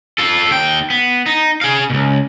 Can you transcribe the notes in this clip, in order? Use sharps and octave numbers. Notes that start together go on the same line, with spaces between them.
F4 A4
D#2 G5
B3
D#4
G#4 F5
C#2 B2